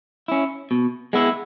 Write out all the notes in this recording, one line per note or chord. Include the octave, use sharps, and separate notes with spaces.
C#4 E4
B2
G#3 B3 E4